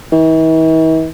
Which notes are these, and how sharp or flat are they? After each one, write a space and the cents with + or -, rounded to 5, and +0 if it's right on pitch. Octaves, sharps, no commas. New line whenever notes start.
E3 -45